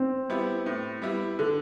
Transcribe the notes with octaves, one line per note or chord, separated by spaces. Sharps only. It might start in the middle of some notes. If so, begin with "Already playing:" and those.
Already playing: C4
G3 B3 E4
A2
G3 B3 E4
D3 A4